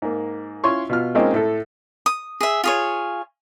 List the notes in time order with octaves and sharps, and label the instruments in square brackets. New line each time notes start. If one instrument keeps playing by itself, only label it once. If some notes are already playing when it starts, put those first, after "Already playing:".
[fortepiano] G#2 A#3
C#4 E4 F4 C#5 C6 C#6
B2 F4 F6
G#3 A#3 C4 C#4 D#4 F4
A2 A4
[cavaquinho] D#6
G#4 E5
F4 G#4 C#5